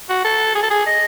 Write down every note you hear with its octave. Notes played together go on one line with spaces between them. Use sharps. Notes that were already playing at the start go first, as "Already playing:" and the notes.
F#4
A4
G#4
A4
G#4
D#5